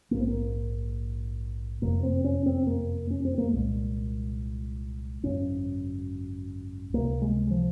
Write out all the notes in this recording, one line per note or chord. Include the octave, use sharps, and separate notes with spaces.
A#1 G#2 A#3
C4
A#3
F#1 F2 C3 A#3
C4
C#4
C4
A#3
C#4
C4
A#3
C2 A#2 G#3
G#1 F#2 C#3 C#4
C#2 C3 A#3
G#3
F3